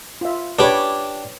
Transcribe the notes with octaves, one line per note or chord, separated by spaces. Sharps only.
F4 E5
D4 G4 B4 C#5 D5